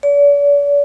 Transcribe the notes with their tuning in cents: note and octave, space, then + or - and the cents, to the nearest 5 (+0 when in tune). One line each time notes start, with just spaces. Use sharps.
D5 -45